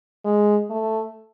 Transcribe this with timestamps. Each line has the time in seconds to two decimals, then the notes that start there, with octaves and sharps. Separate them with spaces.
0.25 G#3
0.70 A3